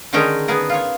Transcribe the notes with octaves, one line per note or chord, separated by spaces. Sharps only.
D3 D#3 G#3 C#4 D#4 G5
B3 G#4 A#4
F4 C#5